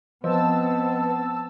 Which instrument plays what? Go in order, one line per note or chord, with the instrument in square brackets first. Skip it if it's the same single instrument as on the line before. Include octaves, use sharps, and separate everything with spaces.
[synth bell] F3 [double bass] B3 C4 [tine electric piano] B4 C5 D#5 [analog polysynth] A5 E6